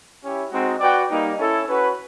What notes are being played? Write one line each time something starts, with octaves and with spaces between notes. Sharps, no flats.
C#4 E4 G4
G#3 C4 D#4 F#4
F#4 B4 D5 G5
G3 A#3 D#4
C#4 E4 A4
C#4 F#4 B4